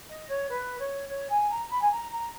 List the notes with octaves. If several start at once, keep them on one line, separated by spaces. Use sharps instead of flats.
D#5
C#5
B4
C#5
C#5
G#5
A#5
B5
G#5
A#5
A#5